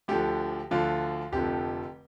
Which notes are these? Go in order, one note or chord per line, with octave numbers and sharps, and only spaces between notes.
D2 D3 F3 G4
D2 D3 F3 F4
F1 F2 D3 F3 G4